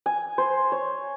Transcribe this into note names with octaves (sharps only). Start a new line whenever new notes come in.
G#5
C5
C#5